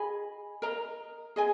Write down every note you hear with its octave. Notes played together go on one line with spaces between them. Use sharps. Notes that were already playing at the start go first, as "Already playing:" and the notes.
Already playing: G#4 D#5 G#5 B5
A#4 D#5 A#5
G#4 D#5 G#5